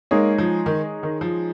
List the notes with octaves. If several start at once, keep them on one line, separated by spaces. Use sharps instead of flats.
G#3 A#3 D#4 G#4 C#5
F3
D#3
D#3
F3